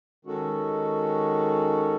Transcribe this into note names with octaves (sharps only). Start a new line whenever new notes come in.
D#3 G#3 C#4 F#4 A4